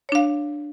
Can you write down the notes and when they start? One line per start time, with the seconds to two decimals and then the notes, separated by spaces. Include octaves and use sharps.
0.09 C#5
0.12 D4
0.15 F5